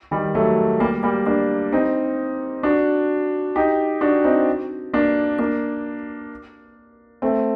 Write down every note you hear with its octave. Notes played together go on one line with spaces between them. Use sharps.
D#3 G3
F#3 A3
G3 A#3
G3 A#3
A#3 D4
C4 D#4
D4 F#4
D#4 G4
D4 F#4
C4 D#4
A#3 D4
A#3 D4
A3 C4